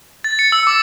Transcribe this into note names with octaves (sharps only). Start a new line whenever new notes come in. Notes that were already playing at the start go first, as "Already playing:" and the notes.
A6
C#7
E6
D6